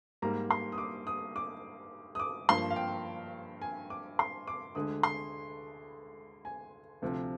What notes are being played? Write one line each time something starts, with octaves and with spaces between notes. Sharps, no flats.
G#2 G3 A#3 A#5
C6
D#6
D6
D#6
D6
D#6
D6
G2 F3 A#3 C6
F5
G5
G#5
D6
C6
D6
D2 D3 G#3 D#6
C6
G#5
D2 C3 F3